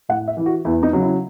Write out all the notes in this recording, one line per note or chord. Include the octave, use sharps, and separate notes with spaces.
A2 F#5
E5
E3 E4
F#4
E2 E4
D#4
C#3 F#3
E4